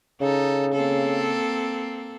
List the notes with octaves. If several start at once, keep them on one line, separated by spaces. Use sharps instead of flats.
C#3 D#4 A4
A#3 C4 A4